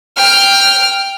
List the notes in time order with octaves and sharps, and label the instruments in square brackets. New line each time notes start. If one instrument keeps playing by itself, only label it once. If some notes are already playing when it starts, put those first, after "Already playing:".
[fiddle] G5 F6